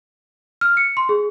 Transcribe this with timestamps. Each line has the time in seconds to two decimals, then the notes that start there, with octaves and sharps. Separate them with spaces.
0.61 F6
0.77 C#7
0.97 C6
1.09 G#4